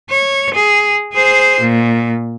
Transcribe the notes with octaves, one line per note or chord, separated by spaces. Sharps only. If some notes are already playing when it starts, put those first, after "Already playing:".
C#5
G#4
G#4 C5
A#2